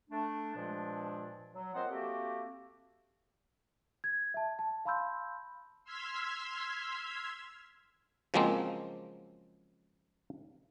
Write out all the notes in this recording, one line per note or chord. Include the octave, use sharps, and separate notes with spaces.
A3 D4
G2 A#2 F3 G#3 D4
F#3
A#3 C4 F4 C5 D#5 F#5
A3 A#3 C4 F#4 G4
G#6
E5 A5
A5
F5 A5 B5 C6 E6 G6
C6 E6 F6 G#6 B6
C#3 F3 F#3 G#3 A#3 C4